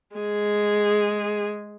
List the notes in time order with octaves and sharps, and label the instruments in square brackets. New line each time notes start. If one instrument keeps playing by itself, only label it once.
[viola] G#3 G#4